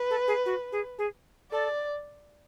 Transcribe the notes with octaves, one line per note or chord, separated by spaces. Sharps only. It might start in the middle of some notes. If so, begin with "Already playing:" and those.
Already playing: B4
A4
G#4
F#4
G#4
G#4
A4 D5